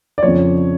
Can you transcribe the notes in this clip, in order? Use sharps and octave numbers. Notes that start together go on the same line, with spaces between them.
D5
F2 C#3 F3 C#5